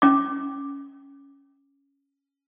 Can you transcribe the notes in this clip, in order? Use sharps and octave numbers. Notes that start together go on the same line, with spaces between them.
C#4 D6